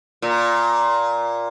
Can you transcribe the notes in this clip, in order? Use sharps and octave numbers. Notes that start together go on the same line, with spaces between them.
A#2